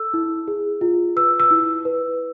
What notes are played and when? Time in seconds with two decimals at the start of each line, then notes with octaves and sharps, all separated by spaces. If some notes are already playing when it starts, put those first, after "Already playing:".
Already playing: A4 E6
0.14 E4
0.48 G#4
0.81 F4
1.16 B4 E6
1.40 E6
1.51 E4
1.85 B4